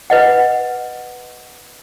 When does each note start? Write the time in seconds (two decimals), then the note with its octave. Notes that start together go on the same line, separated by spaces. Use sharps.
0.10 B4 D#5 F#5